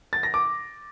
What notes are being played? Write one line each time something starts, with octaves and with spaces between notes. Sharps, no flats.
A6
A#6
D6